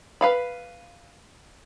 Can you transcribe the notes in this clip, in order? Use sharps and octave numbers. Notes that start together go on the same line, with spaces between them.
B4 F5 B5